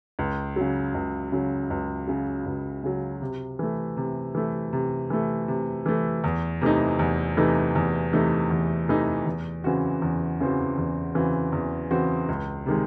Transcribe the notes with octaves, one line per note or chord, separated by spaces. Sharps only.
C#2
C#3 F#3
C#2
C#3 F#3
C#2
C#3 F#3
C#2
C#3 F#3
C3
E3 A3
C3
E3 A3
C3
E3 A3
C3
E3 A3
E2
C3 E3 A3 D#4
E2
C3 E3 A3 D#4
E2
C3 E3 A3 D#4
E2
C3 E3 A3 D#4
E2
C#3 E3 C4 F#4
E2
C#3 E3 C4 F#4
E2
C#3 E3 C4 F#4
E2
C#3 E3 C4 F#4
C#2
C3 D#3 G#3